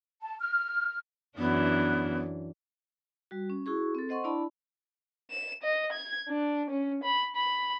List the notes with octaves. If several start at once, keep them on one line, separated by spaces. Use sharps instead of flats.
A5
F6
F#2 E3 B3 D4
G3 F#4
C#4
E4 F#4 G#4 C#6
C4 A4
C5 D#5 F#5 C6 C#6
D4 E4 D5 A5 B5
E7
D#5
G#6
D4
C#4
B5
B5